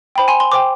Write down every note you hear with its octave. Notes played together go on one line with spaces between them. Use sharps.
C5 G5 B5
G#5 C6
C6
C5 G5 D6